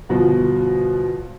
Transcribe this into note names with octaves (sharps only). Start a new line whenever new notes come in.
G1 B2 F3